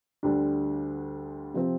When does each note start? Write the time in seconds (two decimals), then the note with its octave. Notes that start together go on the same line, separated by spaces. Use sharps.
0.23 D2 D3 G3 D4
1.54 C3 F3 C4